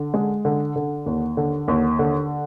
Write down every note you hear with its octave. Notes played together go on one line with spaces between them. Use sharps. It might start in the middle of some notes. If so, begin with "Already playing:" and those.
Already playing: D3
G#3
D3
D3
D#2
D3
D#2
D3